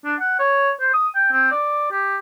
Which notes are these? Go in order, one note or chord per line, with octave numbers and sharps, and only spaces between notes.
D4
F#5
C#5
C5
D#6
G5
C4
D5
G4